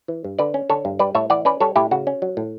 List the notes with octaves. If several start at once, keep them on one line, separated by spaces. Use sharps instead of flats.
E3
G2
D3 B4 D5
C#4
D3 A4 C#5
G2
G3 B4 D5
A2 C#5 E5
E3 D5 F#5
C#4 B4 D5
G3 A4 C#5
A2 E4 G4
C#3 F#4
C#4
F#3
A2